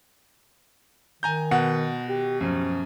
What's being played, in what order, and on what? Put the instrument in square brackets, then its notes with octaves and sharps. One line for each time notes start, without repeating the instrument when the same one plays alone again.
[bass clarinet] D#3 [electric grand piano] G#5 A#5 G6
[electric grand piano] B2 [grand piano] F#5
[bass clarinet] G4
[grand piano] F#2 [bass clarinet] F3